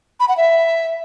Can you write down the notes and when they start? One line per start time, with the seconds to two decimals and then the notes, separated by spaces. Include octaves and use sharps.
0.20 B5
0.29 F#5
0.37 E5